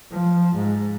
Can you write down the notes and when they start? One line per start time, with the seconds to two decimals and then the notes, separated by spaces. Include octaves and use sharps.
0.11 F3
0.55 G#2